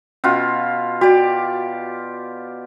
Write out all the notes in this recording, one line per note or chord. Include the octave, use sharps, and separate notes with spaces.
B2 C#4 F4
F#4 G4 D5